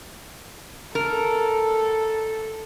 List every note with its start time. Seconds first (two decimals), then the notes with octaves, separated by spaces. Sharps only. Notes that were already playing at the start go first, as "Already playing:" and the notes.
0.95 A4 A#4